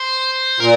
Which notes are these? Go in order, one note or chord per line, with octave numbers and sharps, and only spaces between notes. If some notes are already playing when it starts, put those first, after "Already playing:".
Already playing: C5
A#2 A#4